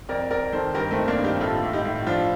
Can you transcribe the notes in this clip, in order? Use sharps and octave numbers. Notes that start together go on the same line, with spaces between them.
F2 A#4 D5
F2 A#4 D5
D#3 A4 C5
G2 G4 A#4
A3 C4
D#3
A#3 D4
G2
D#4 G4
A2 F4 A4
A2
D#4 G4
A2
F3 D4 F4